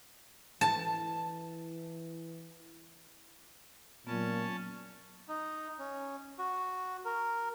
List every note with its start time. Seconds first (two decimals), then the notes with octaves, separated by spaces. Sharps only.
0.61 E3 A5
4.07 A#2 F#3 B3 C#4 A5
5.28 D#4
5.79 C#4
6.38 F#4
7.05 A#4